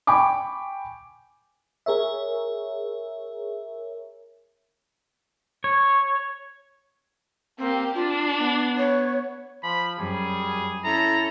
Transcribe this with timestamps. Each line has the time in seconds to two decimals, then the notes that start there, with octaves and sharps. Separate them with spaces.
0.07 G5 G#5 B5 C#6 D6
1.86 G#4 A#4 C#5 E5
5.64 C#5
7.58 A#3 C4 G4
7.95 D4 F4
8.39 B3
8.78 C#5
9.63 F3 B5
9.99 F#2 F#3 G3 G#4
10.84 C#4 E4 A4 A#5